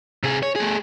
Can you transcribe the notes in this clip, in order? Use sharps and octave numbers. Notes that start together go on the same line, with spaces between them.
C3 G#4
C#5
A3 G#4